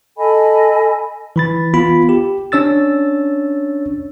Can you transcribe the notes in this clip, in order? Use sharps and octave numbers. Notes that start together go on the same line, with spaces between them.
A4 D#5 G#5 B5
E3 B5 A6
B3 F4 B5
G4
C#4 D4 C#5 E6 A6